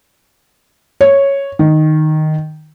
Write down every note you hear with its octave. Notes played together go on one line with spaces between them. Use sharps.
C#5
D#3